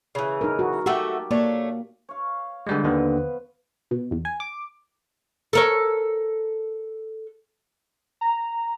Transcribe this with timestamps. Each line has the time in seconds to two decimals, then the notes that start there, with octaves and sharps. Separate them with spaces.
0.15 C#3 E3
0.41 D#4 A#4
0.59 F#4
0.86 A3 F#4 G4 A4
1.31 A3 A#3 D4 C#5
2.09 C#5 F5
2.67 D3 F3 G3 G#3 B3 B4
2.84 D#2 D3 D#3
3.91 B2
4.11 E2
4.25 G#5
4.40 D6
5.53 A4 A#4 C#5
8.21 A#5